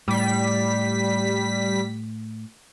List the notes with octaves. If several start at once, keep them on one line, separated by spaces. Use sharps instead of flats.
A2 G3 B6